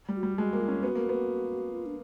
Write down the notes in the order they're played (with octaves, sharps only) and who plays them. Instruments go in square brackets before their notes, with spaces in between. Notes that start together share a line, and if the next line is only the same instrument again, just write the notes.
[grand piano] G3
[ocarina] F#4
[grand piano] G3
[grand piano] G#3 [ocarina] F#4
[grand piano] A#3
[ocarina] F4
[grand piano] C#4
[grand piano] B3 [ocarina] F#4
[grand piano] A#3
B3
[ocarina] F4
D4